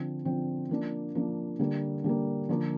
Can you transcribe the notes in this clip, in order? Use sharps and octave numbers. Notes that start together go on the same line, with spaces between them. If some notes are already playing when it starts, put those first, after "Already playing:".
Already playing: D3 F3 C4
D3 F3 C4
F3 A#3 D4
F3 A#3 D4
D3 G3 A#3
D3 G3 A#3
D3 F3 A#3 F4